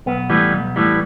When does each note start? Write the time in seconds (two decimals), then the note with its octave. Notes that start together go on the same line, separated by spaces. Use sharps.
0.06 B1 B3
0.30 A2 E3 G3
0.53 B1
0.76 A2 E3 G3